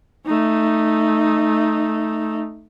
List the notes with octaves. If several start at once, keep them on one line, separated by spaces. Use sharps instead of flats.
A3 D#4